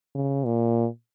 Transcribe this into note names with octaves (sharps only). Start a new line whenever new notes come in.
C#3
A#2